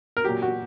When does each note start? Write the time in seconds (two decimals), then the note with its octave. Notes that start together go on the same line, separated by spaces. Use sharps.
0.17 A#4
0.24 A#2 F#3 G4
0.42 F#4